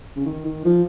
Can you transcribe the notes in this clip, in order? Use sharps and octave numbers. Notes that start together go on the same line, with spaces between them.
C#3
D#3
D#3
F3